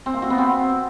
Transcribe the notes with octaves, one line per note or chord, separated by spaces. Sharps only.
C4
A#3
F#4
B3
C4